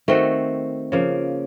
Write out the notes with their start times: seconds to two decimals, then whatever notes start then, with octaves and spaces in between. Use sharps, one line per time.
0.08 D#3 A3 C4 F#4
0.92 C#3 F3 A#3